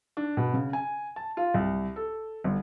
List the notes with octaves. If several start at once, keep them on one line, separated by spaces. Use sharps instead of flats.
D4
B2
C#3
G#5
A5
F4
C2
A4
G1